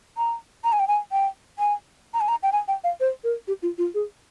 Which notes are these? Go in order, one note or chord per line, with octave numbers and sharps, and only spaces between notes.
A#5
A#5
G#5
G5
G#5
G5
G#5
A#5
G#5
A#5
G5
G#5
G5
F5
C5
A#4
G4
F4
F4
G#4